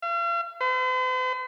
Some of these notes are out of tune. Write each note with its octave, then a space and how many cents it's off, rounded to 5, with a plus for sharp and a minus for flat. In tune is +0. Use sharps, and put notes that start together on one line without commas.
F5 -40
C5 -45